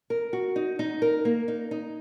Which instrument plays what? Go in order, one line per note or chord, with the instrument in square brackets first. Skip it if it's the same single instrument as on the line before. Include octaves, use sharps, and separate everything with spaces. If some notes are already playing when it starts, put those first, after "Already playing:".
[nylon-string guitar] A#4
F#4
D#4
D#4
A#4
A#3
D#4
D#4